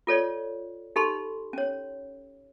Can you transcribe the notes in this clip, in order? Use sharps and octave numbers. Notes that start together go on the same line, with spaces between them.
F4 A4 C#5 D5
D#4 G4 A4 B5 C6
C#4 C#5